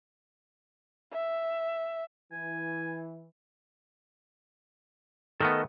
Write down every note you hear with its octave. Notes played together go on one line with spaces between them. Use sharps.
E5
E3 G#5
D#3 A3 B3 A4 D#5 F6